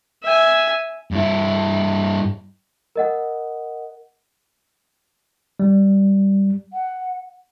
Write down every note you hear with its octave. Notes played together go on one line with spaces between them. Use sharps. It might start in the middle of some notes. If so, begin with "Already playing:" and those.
E5 G#5
G2 E4
A#4 D#5 F#5
G3
F#5